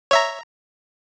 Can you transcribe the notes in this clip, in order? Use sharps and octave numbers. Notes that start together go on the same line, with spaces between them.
C#5 E5 A#5